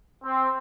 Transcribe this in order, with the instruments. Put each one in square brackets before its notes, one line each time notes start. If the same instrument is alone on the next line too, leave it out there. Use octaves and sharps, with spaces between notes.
[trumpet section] C4